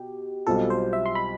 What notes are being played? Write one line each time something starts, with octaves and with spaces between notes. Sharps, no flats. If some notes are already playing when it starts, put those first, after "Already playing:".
Already playing: B2 G4
B1 B2 G3 C4 F4 A4
C5
E5
C6
B5